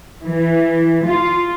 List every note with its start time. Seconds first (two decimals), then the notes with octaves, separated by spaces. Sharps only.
0.22 E3
1.05 F4